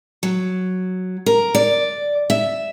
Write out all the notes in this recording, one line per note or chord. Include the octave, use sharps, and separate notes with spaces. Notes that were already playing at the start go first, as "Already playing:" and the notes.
F#3
A#4
D5
E5